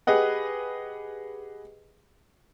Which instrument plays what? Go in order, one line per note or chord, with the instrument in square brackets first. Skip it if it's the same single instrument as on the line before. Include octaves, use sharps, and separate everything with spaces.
[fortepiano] G4 G#4 B4 D#5 F#5